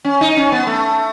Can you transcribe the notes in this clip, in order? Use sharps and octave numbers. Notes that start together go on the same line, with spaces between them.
C#4
D#4
C#4
B3
A3